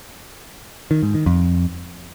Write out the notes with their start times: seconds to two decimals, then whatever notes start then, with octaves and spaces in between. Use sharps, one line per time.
0.91 D#3
1.03 G#2
1.14 D#3
1.26 F2